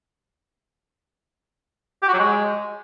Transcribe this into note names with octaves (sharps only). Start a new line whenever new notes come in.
G4
F#4
F#3
G#3